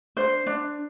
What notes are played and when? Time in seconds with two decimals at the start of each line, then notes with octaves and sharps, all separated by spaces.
0.17 D4 C5
0.47 D4